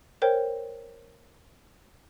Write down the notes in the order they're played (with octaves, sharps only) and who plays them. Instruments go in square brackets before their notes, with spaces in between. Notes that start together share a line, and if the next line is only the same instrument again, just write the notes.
[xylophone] A#4 C5 C#5 G5